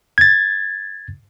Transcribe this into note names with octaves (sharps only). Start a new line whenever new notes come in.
G#6 A6